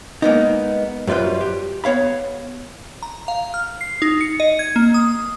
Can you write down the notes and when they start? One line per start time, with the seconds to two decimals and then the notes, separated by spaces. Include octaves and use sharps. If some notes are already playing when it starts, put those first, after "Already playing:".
0.22 G#3 A#3 B3 D#4
1.07 F#2 G3 F4 B4 C5
1.41 G4
1.84 B3 C#5 F5 B5
3.03 A#5
3.28 F5
3.54 F6
3.81 C7
4.02 D#4
4.21 C#7
4.40 D#5
4.59 G#6
4.76 A#3
4.94 D#6